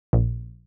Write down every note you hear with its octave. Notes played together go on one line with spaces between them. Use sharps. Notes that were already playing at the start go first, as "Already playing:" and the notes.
A#1